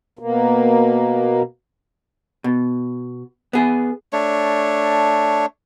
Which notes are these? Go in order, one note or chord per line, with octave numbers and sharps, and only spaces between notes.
B2 A#3
B2
B3 G#4
A3 D4 C#5